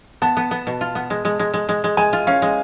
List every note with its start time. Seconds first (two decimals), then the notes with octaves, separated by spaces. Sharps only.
0.22 B3 A5
0.37 B3
0.51 B3
0.67 B2
0.81 F4
0.95 B3
1.10 G#3
1.25 G#3
1.39 G#3
1.54 G#3
1.69 G#3
1.84 G#3
1.97 G#3 G#5
2.13 F4
2.27 C#4 F5
2.42 G#3